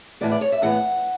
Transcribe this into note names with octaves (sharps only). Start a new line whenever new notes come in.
A2 E3 B3 D5
D5
C#5
E5
A2 E3 B3 F#5